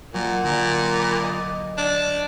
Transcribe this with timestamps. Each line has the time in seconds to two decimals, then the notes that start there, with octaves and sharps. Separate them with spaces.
0.14 A#2 F#3
0.43 A#2 D3
0.99 B5 D6 A#6
1.23 D#5 A6
1.78 D4